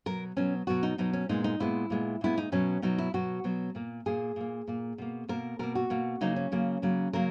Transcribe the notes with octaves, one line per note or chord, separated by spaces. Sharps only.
B2 F#3 B3 A#4
B2 F#3 B3 C#4
B2 F#3 B3 F#4
D#4
B2 F#3 B3 D#4
C#4
A#2 G#3 B3 D#4
D#4
A#2 G#3 B3 E4
A#2 G#3 B3
A#2 G#3 B3 E4
D#4
B2 F#3 B3 C#4
B2 F#3 B3 D#4
E4
B2 F#3 B3 F#4
B2 F#3 B3
A#2 A#3
A#2 A#3 G#4
A#2 A#3
A#2 A#3
B2 A#3
B2 A#3 A#4
B2 A#3 A#4
F#4
B2 A#3
C#3 F#3 A#3 D#4
C#4
C#3 F#3 A#3
C#3 F#3 A#3
C#3 F#3 A#3 A#4